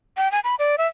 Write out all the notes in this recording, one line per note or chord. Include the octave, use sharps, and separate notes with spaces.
G5
G#5
B5
D5
E5